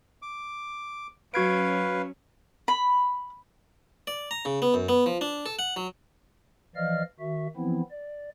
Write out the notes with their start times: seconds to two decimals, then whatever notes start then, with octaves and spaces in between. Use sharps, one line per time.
0.22 D6
1.34 F#3 C#4 F#4 B4 F5 G#6 D7
2.68 B5
4.07 D5
4.31 A#5
4.45 C#3
4.62 B3
4.74 F#2
4.89 B3
5.06 F3
5.21 D4
5.46 A4
5.59 F#5
5.76 F#3
6.76 E3 F3 D5 D#5 F5 F6
7.19 D#3 F#4 E5
7.57 E3 F3 B3 C4 E4
7.91 D5